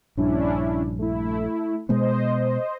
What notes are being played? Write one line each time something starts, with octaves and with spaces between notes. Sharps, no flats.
A#1 G2 C#4 D4 E4
A3 E4
B2 G#3 B3 C5 D#5